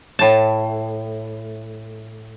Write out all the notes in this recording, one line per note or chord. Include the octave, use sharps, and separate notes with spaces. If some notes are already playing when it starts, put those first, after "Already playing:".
A2 A5